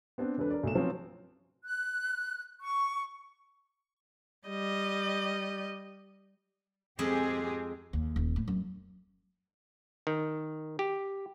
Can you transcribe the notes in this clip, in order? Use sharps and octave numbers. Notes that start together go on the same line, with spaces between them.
B3 C4 D4
E1 D4 A4 B4
A#4 D5
B1 A3 E7
F3 F#3 C4 C#4 B4
F#6
C#6
G3 D#5
F2 G#3 C4 G4 G#4 D#5
D#2
D#1
A2
F#2
D#3
G4